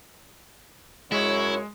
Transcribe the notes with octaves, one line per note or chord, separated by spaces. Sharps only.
F#2 G#3 E4 C#5